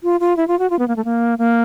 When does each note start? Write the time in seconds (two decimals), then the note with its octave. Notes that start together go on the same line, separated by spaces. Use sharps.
0.03 F4
0.20 F4
0.37 E4
0.48 F4
0.59 F#4
0.70 F4
0.79 B3
0.88 A#3
0.96 A3
1.05 A#3
1.39 A#3